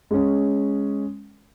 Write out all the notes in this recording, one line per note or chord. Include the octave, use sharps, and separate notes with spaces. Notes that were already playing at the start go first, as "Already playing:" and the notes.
G#3 C#4